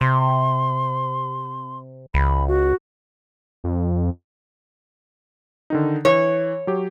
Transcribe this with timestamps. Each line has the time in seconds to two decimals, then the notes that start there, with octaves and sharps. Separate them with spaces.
0.01 C3 C6
2.14 C#2 B5
2.48 F#4
3.64 F2
5.70 D3 D#3 D#4
6.05 E3 C#5
6.67 F#3 G4